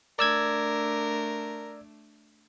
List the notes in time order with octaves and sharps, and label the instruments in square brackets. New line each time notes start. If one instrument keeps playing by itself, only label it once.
[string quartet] A3 D4 [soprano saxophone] A#4 [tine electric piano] D5 E6 G#6